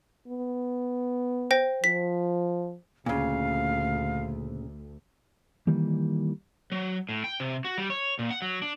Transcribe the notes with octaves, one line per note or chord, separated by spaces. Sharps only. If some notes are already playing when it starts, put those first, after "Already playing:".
B3
C5 G5 A#6
F3 B6
D2 A#2 C#3 F5
D#3 E3 G3 A#3
F#3
A2
G5
C3
F#4
G3
C#5
A#2
F#5
F#3
D4